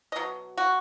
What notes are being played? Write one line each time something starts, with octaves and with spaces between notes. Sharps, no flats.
D#5
B2 F#3
F#4